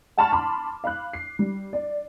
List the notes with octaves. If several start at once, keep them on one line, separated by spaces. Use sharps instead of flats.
F#5 G#5 A5 B5 C#6 F6
A5 B5 C6 D6
F5 B5 F#6
C7
G3
D5